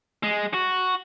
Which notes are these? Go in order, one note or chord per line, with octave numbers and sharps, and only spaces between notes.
G#3
F#4